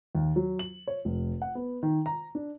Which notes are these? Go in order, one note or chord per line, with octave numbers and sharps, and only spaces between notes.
D#2
F#3
F#7
C#5
F1
F#5
B3
D#3
A#5
D4